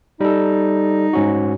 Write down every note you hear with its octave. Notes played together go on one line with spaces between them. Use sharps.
G3 D#4 A4
G#2 C#4 F#4